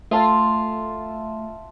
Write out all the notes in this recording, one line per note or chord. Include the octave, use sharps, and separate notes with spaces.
A3 F4 E5 A5